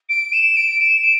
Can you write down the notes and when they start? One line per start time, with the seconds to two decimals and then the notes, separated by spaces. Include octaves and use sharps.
0.09 D7
0.33 E7
0.56 D7
0.81 E7
1.04 D7